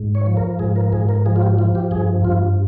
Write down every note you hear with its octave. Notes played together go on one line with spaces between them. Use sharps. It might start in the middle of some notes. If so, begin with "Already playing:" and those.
Already playing: G#2
C#5
F3
A#4
G#2 G#4
A#4
G#2 G#4
A#4
F3 G#4
F4
G4
F3 F4
G4
G2 G#4
G2 F4